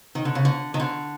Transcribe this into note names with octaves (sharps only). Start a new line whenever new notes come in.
D#3
D3
C#3
D3
D#3
D3